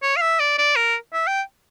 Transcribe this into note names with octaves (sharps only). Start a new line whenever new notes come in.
C#5
F5
E5
D5
D5
A#4
E5
G5